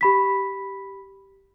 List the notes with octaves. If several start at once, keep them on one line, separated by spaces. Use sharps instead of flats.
G4 B5 B6